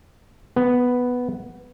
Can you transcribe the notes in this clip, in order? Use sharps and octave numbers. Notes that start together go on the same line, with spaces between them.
B3